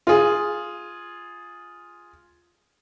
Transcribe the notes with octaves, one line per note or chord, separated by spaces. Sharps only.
F4 G#4